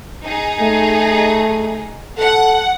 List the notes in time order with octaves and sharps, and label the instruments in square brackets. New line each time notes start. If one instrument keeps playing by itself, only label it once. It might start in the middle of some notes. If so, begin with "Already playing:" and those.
[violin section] D#4 G#4
[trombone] A3
[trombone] A4 [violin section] F#5